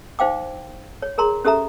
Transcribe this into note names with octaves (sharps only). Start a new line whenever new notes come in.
D#4 C5 F5 G5 D6
C#5
G#4 A#4 A#5 C6
C#4 G4 A4 E5 A#5